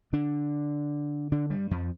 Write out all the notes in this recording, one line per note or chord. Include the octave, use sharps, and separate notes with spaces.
D3 D4
D3 D4
G2 G3
F2 F3